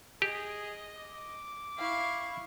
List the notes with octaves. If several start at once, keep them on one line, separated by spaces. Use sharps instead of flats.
G4 G#4 D#5
D6
E4 F5 C#6